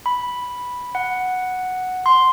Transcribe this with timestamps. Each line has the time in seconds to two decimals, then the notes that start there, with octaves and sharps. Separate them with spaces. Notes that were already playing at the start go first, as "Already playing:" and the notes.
0.06 B5
0.95 F#5
2.06 C6